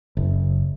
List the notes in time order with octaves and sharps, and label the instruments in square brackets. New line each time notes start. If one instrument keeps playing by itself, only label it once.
[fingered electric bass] F#1